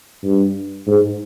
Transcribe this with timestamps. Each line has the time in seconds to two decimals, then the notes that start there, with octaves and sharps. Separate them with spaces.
0.23 G2
0.87 G#2